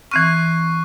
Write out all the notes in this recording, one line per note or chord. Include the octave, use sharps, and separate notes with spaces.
E3 C4 C#6 F6 F#6 C7